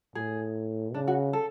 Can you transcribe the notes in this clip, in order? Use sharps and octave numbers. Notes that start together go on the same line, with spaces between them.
A2 G#4
C#3 D4
F#4
A4